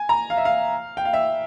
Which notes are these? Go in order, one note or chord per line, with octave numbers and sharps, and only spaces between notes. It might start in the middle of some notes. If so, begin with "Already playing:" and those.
Already playing: G#5
A#5
F5
E5
F5
G5
F5
E5